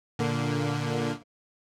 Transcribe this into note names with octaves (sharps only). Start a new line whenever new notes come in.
A#2 D3 A#3